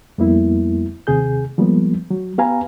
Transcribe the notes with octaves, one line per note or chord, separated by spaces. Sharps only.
F2 G3 A#3 B3 E4
D#2 C3 G#4 G6
F3 G3 G#3 A#3 B3
F#3
B3 G4 B4 F5 G#5 A#5